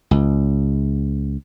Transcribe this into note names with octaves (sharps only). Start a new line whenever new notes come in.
C#2